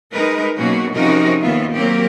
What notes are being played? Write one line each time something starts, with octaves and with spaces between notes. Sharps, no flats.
G#3 D#4 A#4 B4
B2 F#3 A#3 C#4 F#4
C3 F3 C#4 D#4 F#4 A#4
D#2 B3 F4 E5
F#3 A#3 C4 G4 A#4